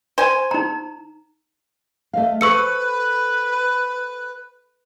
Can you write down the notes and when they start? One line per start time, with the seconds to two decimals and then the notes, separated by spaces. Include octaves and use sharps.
0.18 C5 G#5
0.51 D#4 A#5
2.13 A3 D#5 F5
2.41 A4 B4 C5 C#6 E6 C#7